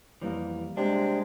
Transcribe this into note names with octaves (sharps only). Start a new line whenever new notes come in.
F2 E3 G3 A#3
C3 G#3 D4